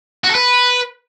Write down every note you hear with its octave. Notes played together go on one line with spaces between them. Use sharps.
F#4
A4
B4